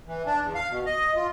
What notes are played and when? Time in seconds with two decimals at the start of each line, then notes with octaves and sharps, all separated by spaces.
0.07 E3
0.26 D4
0.42 E2
0.55 F5
0.70 B2
0.86 D#5
1.16 F4